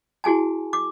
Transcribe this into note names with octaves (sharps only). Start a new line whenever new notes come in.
E4 F#4 G#4 G#5 A5
D6